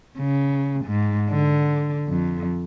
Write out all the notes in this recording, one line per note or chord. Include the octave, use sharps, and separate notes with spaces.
C#3
G#2
D3
F2